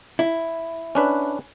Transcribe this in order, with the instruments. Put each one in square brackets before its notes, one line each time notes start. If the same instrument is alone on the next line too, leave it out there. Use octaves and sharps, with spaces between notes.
[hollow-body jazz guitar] E4
[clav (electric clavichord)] C#4 D4 B4